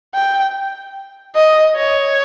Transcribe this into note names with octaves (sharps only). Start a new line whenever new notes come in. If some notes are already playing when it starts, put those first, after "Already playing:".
G5
D#5
C#5